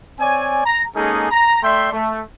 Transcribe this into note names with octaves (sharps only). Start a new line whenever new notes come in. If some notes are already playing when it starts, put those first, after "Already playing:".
C4 C#5 D5 G#5
A#5
G#3 A#3 C#4 D#4 G#4 A4
A#5
A3 D5 E5 G5 C6
A3